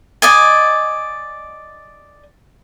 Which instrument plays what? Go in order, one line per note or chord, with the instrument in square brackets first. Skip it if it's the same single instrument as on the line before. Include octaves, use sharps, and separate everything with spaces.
[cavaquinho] D5 D#5 G#5